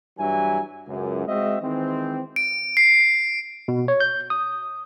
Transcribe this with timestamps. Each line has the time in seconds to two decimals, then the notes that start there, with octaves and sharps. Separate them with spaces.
0.18 G2 E3 F#3 E4 G#5
0.88 C#2 F#2
1.27 G#3 C4 F#4 D#5 E5
1.62 D#3 E3 G#3 C4
2.36 D7
2.77 C7
3.68 B2
3.88 C#5
4.00 G6
4.30 D#6